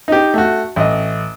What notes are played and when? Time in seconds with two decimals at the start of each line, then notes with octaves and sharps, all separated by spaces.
0.08 D#4 G4
0.34 A3 F#4
0.76 A1 D#5